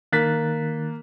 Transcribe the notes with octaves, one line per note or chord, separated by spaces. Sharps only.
D#3 A#3 F#6 A6 B6